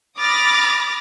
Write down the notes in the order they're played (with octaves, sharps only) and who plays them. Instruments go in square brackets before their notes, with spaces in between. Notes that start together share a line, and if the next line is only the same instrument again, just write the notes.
[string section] B5 D6 D#6 F6 A6 A#6